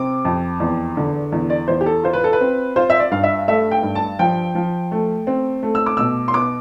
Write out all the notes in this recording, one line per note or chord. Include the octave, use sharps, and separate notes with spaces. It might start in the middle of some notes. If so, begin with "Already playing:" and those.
Already playing: C3 C4 D6
F2
E2
D3
E2
D5
E2 C5
G4
A4
F4 C5
B4
A4
B4
C4
F4 C5
E5
D5
G2 F5
E5
A3 E5
G5
G2
A5
F3 G5
F3
A3
C4
A3
E6
D6
B2 E6
C6
B3 D6